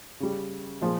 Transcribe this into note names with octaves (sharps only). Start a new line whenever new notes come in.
C#3 G3
A#2 F3 G#3